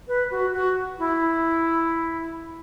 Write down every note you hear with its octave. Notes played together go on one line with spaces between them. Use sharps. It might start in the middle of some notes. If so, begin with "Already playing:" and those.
B4
F#4
F#4
E4